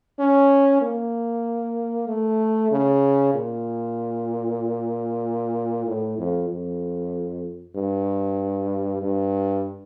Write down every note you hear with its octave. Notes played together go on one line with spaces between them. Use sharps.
C#4
A#3
A3
C#3
A#2
A2
F2
F2
G2
G2